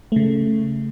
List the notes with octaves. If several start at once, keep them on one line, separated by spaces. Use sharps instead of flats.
C#3 A3